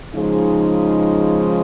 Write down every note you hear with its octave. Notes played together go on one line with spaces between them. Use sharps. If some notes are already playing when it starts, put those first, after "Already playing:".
C#3 F3 G#3 D#4